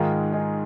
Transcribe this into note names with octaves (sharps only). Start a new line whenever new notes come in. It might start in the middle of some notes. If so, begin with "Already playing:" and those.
Already playing: G#2 D#3 G#3 F4 A#4
D#4 G#4